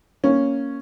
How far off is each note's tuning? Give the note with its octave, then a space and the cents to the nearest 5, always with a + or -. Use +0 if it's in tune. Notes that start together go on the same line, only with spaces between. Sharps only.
A#3 +0 C#4 +0